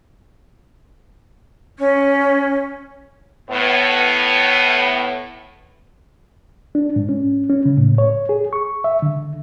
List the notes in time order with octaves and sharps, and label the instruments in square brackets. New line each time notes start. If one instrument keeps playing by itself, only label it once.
[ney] C#4
[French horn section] A2 B3
[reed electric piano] D4
G#2
C#4
C#4
C#3
A2
C#5
G#4
C#6
E5
D3